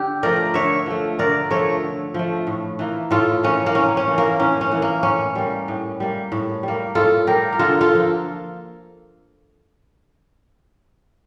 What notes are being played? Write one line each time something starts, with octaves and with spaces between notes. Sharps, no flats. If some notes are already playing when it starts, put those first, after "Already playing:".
Already playing: D3 G4
F3 A3 A#4 D5
D3 C#5 E5
F3 A3
D3 A#4 D5
F3 A3 A4 C#5
D3
F3 A3
A2
E3 A#3
A2 F4 A4
E3 A#3 C#4
A#3
A2 C#4
C#4
E3 A#3
A#3
A2 C#4
C#4
E3 A#3
A#3
A2 C#4
G3 A#3
A2
G3 A#3
A2
G3 A#3
A2 F4 A4
G3 A#3 G4 A#4
A#4
D3 F4 A4
F4 A4
F3 A#3